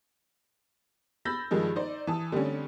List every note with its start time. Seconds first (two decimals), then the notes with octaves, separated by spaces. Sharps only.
1.25 B5 E6 G6 A6 A#6
1.51 G2 D#3 F3 G#3
1.76 D#4 C5 D5
2.07 E3 A5 D#6
2.32 D3 G3 A3 C4 C#4